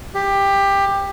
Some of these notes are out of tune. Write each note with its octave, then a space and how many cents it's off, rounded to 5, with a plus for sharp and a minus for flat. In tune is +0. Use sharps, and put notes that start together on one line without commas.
G4 +15